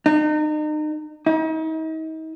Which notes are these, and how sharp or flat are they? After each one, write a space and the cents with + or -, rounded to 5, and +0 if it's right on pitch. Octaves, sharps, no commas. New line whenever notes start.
D#4 -35
D#4 +40